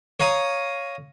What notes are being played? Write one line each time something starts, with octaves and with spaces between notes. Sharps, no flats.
C#5 F5 A#5 D#6